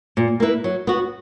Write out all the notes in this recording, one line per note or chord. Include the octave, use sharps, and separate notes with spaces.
A#2
A#3 E4 B4
F#3
B3 F#4